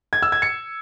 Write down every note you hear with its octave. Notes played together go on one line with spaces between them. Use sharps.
G#6
E6
G#6
C#7